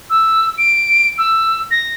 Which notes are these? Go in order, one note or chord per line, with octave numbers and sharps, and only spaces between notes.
E6
D7
E6
A#6